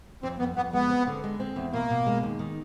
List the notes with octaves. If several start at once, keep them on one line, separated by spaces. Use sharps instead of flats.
F2 C4
F2 B3
F2 B3
G#3 B3
C4
D3
G#3
C4
E2
B2 A#3
B2
G#3
D#2
D#3